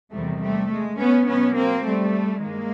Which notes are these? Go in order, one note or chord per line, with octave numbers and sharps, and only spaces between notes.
E2 C3 D#3 G3 A3
G3 A3
G#3
B3 C#4
B2 F#3 B3 C#4
A#3 C4
G3 A3
G2 D#3 G#3 A#3